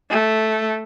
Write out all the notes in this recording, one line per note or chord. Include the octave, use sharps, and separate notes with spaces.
A3